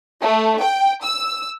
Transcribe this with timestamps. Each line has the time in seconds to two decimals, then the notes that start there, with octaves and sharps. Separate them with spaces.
0.22 A3
0.61 G5
1.03 E6